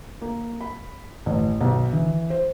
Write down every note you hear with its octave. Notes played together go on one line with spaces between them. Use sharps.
A#3
B5
A1
B1
E3
C5